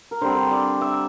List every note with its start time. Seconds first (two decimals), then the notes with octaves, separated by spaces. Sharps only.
0.11 A#4
0.21 D3 G3 C4 C5
0.51 D5
0.81 E5